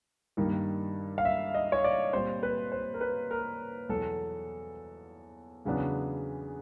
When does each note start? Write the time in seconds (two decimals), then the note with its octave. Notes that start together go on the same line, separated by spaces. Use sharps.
0.37 G2 D#3 G3 A#3
1.18 F5
1.25 E5
1.54 D#5
1.72 C#5
1.84 D5
2.13 A#2 G3 C4 C5
2.43 B4
2.72 C5
2.94 A#4
3.01 B4
3.31 A#4
3.89 E2 B2 F#3 A4
5.65 E2 C#3 F#3 B3 D4